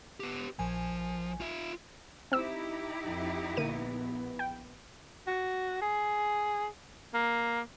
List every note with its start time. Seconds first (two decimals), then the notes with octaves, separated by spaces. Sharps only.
0.20 B3 G4
0.59 A#1 F3 G#5
1.41 F4 E5
2.32 C4 D#4 E4 G4 E6
3.06 F2
3.57 A#1 D3 A#3 B3 D#7
4.39 G5
5.27 F#4
5.82 G#4
7.14 A#3